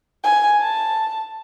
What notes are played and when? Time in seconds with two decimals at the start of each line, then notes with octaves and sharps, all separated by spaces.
0.24 G#5
0.61 A5